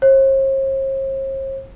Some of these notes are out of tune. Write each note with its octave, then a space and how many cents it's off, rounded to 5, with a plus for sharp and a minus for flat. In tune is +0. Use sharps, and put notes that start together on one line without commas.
C5 +45